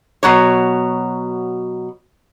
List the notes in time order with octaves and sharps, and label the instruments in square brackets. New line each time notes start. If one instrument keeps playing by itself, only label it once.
[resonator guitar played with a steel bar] B2 F#3 C#5